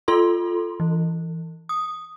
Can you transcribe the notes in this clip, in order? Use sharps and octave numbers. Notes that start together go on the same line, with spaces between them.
F4 A4 C6
E3
D#6